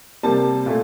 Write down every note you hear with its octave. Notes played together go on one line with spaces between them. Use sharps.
C3 G3 A#3 A5
A#2 A3